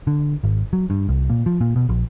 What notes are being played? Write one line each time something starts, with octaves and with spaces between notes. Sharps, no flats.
D3
G#1
F#3
G2
C2
A#2
F3
A#2
B2
A#1